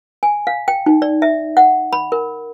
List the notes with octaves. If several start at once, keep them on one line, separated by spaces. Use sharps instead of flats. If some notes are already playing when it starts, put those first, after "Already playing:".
G#5
F5
G5
D#4
D5
E5
F#5
B5
A#4